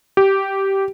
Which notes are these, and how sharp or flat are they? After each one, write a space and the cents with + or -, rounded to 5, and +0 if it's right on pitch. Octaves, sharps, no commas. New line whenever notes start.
G4 -10